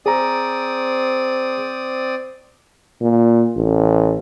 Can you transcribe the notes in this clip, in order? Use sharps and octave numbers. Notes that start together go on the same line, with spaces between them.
C4 G#4 D5 A#5 D#6
A#2
A1